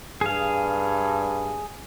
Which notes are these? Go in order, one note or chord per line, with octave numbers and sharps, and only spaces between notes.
G2 G#4 F5